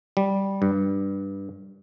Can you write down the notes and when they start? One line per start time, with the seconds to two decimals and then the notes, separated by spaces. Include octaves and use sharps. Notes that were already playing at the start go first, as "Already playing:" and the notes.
0.17 G3
0.62 G2